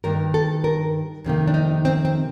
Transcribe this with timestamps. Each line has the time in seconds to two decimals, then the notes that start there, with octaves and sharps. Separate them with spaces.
0.04 G2 D#3 A#3 A#4
0.34 A4
0.64 A#4
1.24 F2 C3 D#3 A#3
1.48 D4
1.54 D#4
1.85 C4
2.05 C4